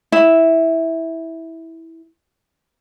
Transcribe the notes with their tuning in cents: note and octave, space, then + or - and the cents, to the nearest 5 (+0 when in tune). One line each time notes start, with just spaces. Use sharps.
E4 -10